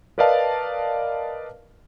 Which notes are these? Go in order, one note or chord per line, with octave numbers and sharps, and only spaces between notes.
A#4 B4 D5 D#5 F5 A5